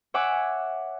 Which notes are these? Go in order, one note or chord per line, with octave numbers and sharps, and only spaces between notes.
C#5 E5 F#5 G#5 D6